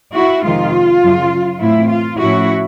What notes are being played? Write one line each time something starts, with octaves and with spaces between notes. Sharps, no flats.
E4 F#4
F2 C3 D#3 G#3 F4
F#2 C#3 F#3
A2 E3 A3 C4 E4
F4
A2 F3 A3 C#4 E4 F#4